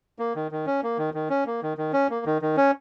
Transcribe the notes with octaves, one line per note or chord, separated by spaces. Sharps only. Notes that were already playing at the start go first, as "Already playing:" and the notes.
A#3
D#3
D#3
C#4
A#3
D#3
D#3
C#4
A#3
D#3
D#3
C#4
A#3
D#3
D#3
C#4